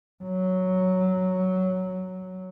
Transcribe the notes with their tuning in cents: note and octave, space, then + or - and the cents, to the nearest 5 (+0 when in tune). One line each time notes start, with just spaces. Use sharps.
F#3 +5